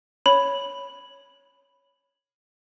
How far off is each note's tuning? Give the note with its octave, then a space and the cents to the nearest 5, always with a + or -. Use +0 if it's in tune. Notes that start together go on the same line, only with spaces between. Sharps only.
C#5 +0 B5 +0